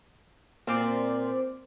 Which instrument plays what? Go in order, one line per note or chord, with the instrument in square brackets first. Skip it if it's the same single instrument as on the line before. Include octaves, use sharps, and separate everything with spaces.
[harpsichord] A#2 [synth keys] C4 C5 D5